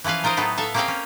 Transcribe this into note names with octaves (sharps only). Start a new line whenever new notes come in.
E3 F3 C#4 B4 F5
D#4 F4 A#4 C5 D#5
A2 F#3 B3 D#4 A4
A4 E5 F5
A#3 C4 C#4 G#4 F5 G5
C#4